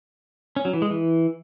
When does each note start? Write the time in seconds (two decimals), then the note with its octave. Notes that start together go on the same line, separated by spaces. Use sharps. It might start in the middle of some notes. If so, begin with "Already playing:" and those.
0.56 C#4
0.65 F#3
0.73 E3
0.82 G#3
0.90 E3